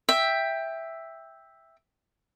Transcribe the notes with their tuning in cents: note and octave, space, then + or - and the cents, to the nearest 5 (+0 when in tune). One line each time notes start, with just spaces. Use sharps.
E5 +0 G5 +10